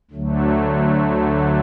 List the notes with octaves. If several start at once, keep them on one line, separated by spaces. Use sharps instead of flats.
D2 D3 F#3 A3